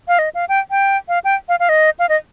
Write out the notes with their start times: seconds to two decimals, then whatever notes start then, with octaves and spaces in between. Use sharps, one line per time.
0.08 F5
0.19 D#5
0.35 F5
0.49 G5
0.71 G5
1.08 F5
1.24 G5
1.49 F5
1.60 F5
1.69 D#5
1.99 F5
2.09 D#5